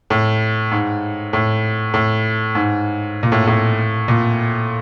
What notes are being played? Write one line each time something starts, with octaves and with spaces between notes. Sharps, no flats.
A2
G#2
A2
A2
G#2
A#2
A2
A2
A#2